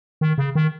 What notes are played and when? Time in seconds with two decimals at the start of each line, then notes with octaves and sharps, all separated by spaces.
0.21 D#3
0.38 C#3
0.55 D#3